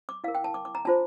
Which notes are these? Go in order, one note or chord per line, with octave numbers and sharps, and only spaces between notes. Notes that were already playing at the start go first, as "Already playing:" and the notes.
D6
E4 A#4 F5
G5
A5
D6
D6
A#5
D4 F4 C5 A5